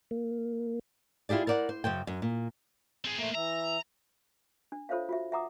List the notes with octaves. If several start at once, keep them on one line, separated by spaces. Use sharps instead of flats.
A#3
E4 F4 G4 G#4 D5
A#4 C5 D5 E5 F#5
C5
F#2 C#3 C5 G5
F#2
A#2
C4 G#4
A3 A#3 C5
E3 E5 A#5
D4
F4 A4 C5 C#5 E5 F5
F4 F#4 E5
E5 F#5 A#5 D6 D#6